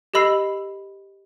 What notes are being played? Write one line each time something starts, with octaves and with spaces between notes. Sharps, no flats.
G4 A4 D#5 B5 E6 C7